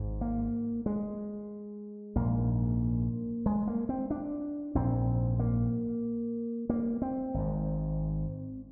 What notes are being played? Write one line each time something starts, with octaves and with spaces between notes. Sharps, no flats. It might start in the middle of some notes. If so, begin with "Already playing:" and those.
Already playing: G#1 G#2
A#3
G#3
A#1 G#2 A#3
G#3
A#3
C4
D4
A#1 G#2 C4
A#3
A#3
C4
G#1 G#2